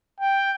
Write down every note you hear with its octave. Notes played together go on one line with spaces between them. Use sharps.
G5